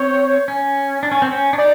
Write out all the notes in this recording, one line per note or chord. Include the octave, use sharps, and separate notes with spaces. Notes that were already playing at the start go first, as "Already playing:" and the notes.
Already playing: C4 C#5
C#4
D4
C#4
C4
C#4
D4
D#4 D5